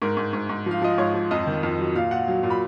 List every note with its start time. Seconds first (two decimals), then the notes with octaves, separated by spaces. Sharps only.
0.02 G#2 A#4
0.17 G#2
0.33 G#2
0.49 G#2
0.66 F3 F5
0.82 F3 D#5
0.98 G#2 C#5
1.14 F3
1.31 F2 D#5
1.47 D#3
1.63 F2
1.79 F#3
1.95 A#2 F5
2.11 A#2 F#5
2.28 F#3
2.43 A#2
2.50 B5